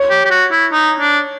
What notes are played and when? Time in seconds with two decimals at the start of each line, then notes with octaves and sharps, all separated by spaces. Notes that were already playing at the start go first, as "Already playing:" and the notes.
Already playing: C#5
0.10 G4
0.25 G4
0.30 F#4
0.51 E4
0.72 D#4
1.00 D4